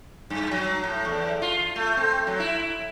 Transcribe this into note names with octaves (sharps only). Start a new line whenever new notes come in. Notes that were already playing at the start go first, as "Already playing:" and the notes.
G2
F#3
A2
E2
F4
A3
C4
F#3
E4